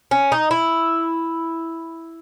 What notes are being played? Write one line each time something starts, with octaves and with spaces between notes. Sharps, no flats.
C#4
D#4
E4